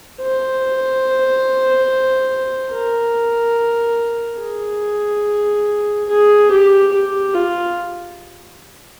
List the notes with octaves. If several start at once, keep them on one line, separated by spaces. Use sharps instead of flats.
C5
A#4
G#4
G#4
G4
G4
F4